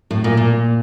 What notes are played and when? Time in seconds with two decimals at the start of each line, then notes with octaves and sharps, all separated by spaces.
0.11 A2
0.24 A#2
0.37 A#2